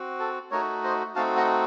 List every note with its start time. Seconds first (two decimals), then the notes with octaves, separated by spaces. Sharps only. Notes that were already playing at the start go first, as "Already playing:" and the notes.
Already playing: C4 F#4
0.20 A4
0.51 A3 D#4 F#4 A#4 C#5
0.84 C5 D#5
1.15 A3 C4 D#4 F#4 F5 A5
1.37 D#5 F#5